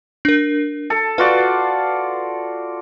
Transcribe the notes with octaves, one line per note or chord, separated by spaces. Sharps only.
D4 A#4
A4
F4 F#4 B4 D5